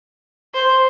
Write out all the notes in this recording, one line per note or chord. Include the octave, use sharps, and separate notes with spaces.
C5